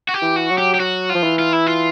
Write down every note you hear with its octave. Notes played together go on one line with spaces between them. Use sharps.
F#4
G4
E3
F#4
F#3
G4
G4
F#3 F#4
F4
F3
E3
F4
E4
F4